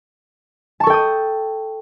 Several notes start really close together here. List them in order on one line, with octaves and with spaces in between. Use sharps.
A5 C#6 A4 G5 D#6